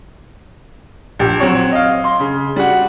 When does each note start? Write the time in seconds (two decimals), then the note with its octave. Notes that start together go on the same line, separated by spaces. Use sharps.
1.19 A#1 G4
1.40 F#3 C4 C#5
1.72 D#5 F5
2.04 C6
2.20 C#3
2.56 G3 F#4